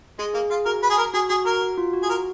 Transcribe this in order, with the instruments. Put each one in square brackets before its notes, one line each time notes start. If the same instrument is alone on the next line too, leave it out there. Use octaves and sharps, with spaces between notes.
[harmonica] G#3 [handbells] G#4
[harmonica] A#3 [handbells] G#4
[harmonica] F4 [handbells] G#4
[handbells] F#4 [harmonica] A#4
[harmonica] B4
G#4
A#4
[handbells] F#4 [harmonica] G#4
[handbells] F#4 [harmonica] G#4
[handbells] F#4 [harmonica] A#4
[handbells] F#4
F4
F#4
[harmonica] G#4
[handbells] F#4 [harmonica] A#4